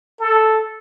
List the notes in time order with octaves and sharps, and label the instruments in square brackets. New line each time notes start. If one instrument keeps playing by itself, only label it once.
[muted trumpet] A4